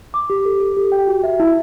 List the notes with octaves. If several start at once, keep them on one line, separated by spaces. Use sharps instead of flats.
D6
G4
A4
A4
G4
G5
F#4
E5
E4